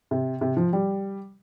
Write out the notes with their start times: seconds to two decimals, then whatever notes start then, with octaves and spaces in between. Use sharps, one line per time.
0.11 C3
0.41 C3
0.57 F3
0.73 G3